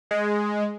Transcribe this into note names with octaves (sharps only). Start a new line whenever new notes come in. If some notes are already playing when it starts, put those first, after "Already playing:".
G#3